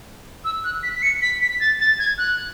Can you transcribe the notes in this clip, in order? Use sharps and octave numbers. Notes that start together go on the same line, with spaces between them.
E6
F#6
B6
B6
C#7
B6
B6
A6
A6
G#6
F#6